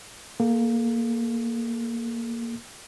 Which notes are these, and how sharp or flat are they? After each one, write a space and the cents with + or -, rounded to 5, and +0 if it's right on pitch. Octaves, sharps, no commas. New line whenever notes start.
A#3 +0 A4 -35